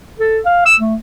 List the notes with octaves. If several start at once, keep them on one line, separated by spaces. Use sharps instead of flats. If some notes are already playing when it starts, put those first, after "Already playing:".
A4
F5
E6
A3